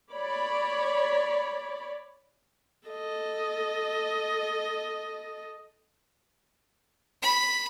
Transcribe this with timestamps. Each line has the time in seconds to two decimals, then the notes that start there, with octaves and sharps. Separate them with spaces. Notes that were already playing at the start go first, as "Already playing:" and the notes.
0.11 C#5 D5 B5
2.88 A4 D#5
7.22 B5